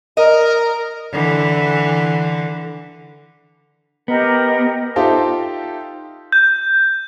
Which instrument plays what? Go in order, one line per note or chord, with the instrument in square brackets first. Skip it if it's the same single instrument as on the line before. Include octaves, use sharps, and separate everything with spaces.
[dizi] A#4 [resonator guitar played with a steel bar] D#5
[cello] D3 E3
[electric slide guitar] B3 [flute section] G4 A#4 D#5
[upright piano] D#4 F4 G4 A4 C5 E5
[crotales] G6